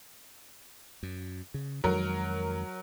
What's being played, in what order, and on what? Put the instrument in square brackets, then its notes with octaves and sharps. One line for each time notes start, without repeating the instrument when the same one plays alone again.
[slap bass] F#2
C#3
[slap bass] F2 D#3 G#3 [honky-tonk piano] F#3 A#4